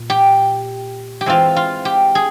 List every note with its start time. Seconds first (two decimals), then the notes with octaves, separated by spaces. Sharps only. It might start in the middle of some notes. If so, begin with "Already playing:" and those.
Already playing: A#2
0.10 G4
1.21 G4
1.26 E3 G#3 C4 F4
1.56 F4
1.85 G4
2.15 G#4